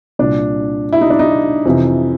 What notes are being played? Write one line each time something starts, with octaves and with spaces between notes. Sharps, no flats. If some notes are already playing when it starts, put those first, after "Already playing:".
C2 A#2 D4
E4
D#4
D4
D#4
F2 C3 E3